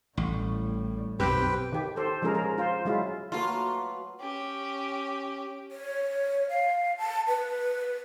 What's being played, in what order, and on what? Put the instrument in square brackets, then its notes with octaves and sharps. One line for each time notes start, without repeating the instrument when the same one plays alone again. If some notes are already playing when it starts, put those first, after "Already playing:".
[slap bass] A1 [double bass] A2 G3
[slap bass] B1 F#2 [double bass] B2 [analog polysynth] C4 G4 [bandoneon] B4 G5
[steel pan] D#3 G4
G4 A4 C5
F3 G#3 C#4 G#4 A#4
A#4
F4 C5
F#3 G#3 E4 F4
[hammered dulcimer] F#3 A3 B4 [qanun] A#3 A4 [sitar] F4 [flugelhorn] F#4
[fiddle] C#4 G4
[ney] C#5
F5
A5
B4